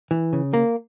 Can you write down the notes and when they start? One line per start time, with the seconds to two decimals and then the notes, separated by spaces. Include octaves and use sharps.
0.11 E3
0.33 C#3
0.54 A#3